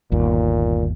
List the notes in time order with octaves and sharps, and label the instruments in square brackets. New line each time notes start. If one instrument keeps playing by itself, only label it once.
[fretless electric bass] G1 D#2 [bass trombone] A#2